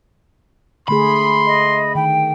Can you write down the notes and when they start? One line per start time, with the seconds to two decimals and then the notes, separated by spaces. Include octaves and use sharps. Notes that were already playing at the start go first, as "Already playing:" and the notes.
0.88 D3 A3 G#4 B5 C6
1.46 D#5
1.95 D#3 G5